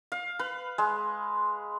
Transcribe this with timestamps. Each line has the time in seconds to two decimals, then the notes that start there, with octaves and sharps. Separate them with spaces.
0.12 F5
0.39 B4
0.78 G#3